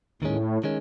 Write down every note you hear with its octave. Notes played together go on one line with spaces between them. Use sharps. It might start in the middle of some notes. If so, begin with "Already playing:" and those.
D#2 A2 D#3 G#3 C#4
D#3 G#3 C#4